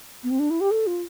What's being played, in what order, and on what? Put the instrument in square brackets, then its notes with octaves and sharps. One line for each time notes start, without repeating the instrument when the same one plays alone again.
[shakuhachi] B3
C4
D4
E4
G4
A4
F4